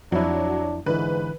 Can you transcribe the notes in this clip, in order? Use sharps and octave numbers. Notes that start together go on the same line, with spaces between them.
F2 F#3 D4 E4
G#2 D3 E3 B4